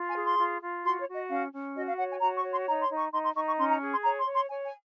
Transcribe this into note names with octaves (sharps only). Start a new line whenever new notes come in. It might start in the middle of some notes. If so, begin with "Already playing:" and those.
Already playing: F4
G#5
G#4
C6
F4
F4
F#4 C6
C#5
F#4
D#5
C#4 F5
C#4
F#4 D#5
F5
C#5 F#5
G#5
F#4 A#5
C#6
C#5
C6
D#4 A#5
C6
D#4
C#6
D#4 C6
C6
D#4 C#6
C#6
C#4 C6
A#5
G#4
C6
C#5 A#5
C6
C#5
C6
C#5 G#5
G#5